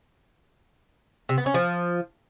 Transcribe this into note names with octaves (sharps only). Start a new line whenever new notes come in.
C3
B3
C#4
F3